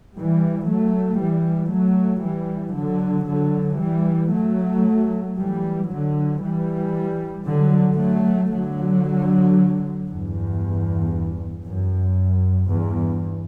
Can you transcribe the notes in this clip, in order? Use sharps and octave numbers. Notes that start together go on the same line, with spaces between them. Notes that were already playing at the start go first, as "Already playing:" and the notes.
E3 G3
F#3 A3
E3 G3
F#3 A3
E3 G3
D3 F#3
D3 F#3
E3 G3
F#3 A3
E3 G3
D3 F#3
E3 G3
D3 F#3
F#3 A3
D3 F#3
E2 G2
F#2
E2 G2